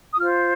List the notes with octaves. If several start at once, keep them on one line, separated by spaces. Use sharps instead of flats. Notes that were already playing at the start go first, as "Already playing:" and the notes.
D#6
F4 C5 F6